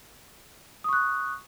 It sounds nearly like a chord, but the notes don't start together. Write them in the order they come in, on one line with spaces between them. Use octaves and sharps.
D#6 C#6 F#6